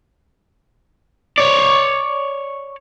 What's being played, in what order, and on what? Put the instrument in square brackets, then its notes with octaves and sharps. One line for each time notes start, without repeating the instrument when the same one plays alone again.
[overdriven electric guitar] C#5 D5